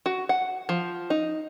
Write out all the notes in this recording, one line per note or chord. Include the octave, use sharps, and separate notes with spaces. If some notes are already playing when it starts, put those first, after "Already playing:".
F#4
F#5
F3
D#4